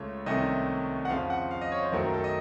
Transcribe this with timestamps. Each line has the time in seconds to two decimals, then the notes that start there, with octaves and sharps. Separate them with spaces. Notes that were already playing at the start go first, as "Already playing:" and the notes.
Already playing: C#2 C#3 A3 C#5
0.26 C2 C3 D#3 A3 C#4 D#5
1.05 F#5
1.10 F2 C#3 F3 C4 F5
1.30 F#5
1.51 F5
1.61 D#5
1.72 C#5
1.82 C5
1.92 F#2 D#3 F#3 A3 A#4
2.03 A#4
2.14 A4
2.24 D#5